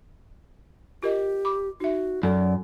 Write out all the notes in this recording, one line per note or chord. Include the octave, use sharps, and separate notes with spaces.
F4 G4 A#4 D#5
B5 D6
D#4 F#4 E5
F#2 A4 D5